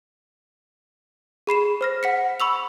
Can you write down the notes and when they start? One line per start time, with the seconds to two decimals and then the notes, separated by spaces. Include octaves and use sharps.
1.47 G#4 B5 C7 E7
1.81 C5 F6 A#6
2.03 F#5 B6 C#7
2.40 B5 C#6 E6 F7